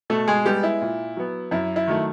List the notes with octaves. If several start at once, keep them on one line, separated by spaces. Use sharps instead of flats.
B2 A3 A4
G#3 G#4
G3 G#3 B3 G4
E4
A#2
F#3 B3
F#2 E4
E4
D#3 F#3 A3